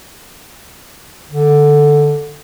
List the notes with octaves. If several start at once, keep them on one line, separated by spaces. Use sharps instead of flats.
D3